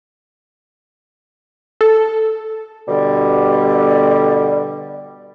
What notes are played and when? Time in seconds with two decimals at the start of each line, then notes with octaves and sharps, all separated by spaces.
1.81 A4
2.88 B2 D3 G3